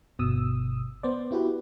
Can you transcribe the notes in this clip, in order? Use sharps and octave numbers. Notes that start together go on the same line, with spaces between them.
G1 B2 D#6 E6
B3 C5 D5
B3 E4 F#4 G4 B4